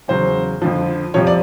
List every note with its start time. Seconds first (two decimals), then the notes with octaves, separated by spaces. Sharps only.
0.08 E2 C#3 F#3 C5
0.62 F2 D3 F3
1.14 F2 C3 F3 C#5
1.27 D5